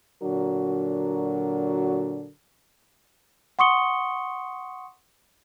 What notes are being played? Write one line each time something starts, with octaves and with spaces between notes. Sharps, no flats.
A#2 D3 F#3 D4 F#4 A#4
F#5 C6 C#6 D#6 C#7 G7